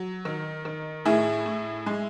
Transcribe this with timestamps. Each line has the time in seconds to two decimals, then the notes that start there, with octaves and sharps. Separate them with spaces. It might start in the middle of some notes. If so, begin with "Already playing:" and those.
Already playing: F#3
0.25 D#3
0.65 D#3
1.05 A2 E4 G#4
1.46 A2
1.86 G#3